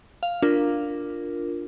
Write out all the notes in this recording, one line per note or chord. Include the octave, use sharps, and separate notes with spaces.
F5
D4 F4 A#4